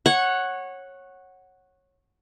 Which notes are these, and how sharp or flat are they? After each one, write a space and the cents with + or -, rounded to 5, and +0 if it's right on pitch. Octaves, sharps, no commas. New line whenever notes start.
C#5 -15 F#5 +0